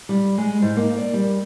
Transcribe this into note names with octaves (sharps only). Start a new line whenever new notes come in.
G3
G#3
G#2
A#3
D5
G3